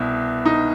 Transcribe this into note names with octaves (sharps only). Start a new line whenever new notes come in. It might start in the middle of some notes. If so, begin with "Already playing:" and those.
Already playing: C2 B2
D#4